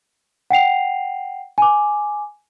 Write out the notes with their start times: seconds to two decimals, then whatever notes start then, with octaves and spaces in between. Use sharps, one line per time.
0.50 F#5 G5 C7 F7
1.58 G#5 D6